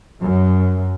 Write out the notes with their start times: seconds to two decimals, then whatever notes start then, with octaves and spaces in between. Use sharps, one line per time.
0.21 F#2